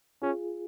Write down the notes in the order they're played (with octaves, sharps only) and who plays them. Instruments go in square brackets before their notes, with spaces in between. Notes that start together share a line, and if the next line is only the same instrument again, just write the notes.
[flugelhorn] C#4 [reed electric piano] F4 G#4